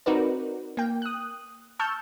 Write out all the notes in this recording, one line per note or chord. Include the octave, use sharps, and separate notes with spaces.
C4 D#4 F#4 A#4 B4 D5
A#3 G5
D#6 F#6
A5 C#6 E6 F6 G6